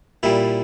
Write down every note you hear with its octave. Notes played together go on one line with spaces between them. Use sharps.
A#2 G3 E4